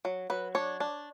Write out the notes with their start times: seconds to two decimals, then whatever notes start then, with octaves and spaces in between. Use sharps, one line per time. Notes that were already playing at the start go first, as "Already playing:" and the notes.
0.05 F#3
0.30 F#3 B4
0.55 D4 C#5
0.80 D4